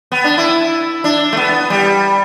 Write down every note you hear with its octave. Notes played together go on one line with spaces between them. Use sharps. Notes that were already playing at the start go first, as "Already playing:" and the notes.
B3
D4
E4
D4
A3
B3
G3